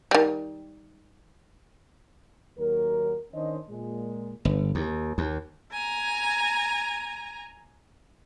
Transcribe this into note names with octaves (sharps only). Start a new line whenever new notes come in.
D#3 G3
D#2 F#3 A#4
D#3 C#4 D4 C5 C#5 D#5
A#2 G#3
G1
D#2
D#2
G#5 A#5